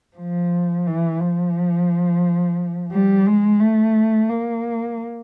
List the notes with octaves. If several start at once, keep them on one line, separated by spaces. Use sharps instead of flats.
F3
E3
F3
G3
G#3
A3
A#3